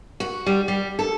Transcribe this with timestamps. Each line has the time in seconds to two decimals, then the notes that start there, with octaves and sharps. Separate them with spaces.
0.20 F#4
0.46 G3
0.68 G3
0.99 A4